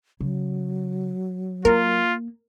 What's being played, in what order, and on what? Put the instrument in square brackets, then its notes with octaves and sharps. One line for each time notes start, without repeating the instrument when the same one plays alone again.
[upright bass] C#3 [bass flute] F#3
[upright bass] A#3 [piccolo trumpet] F4 [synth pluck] A#4